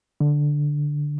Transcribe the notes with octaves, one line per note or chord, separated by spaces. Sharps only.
D3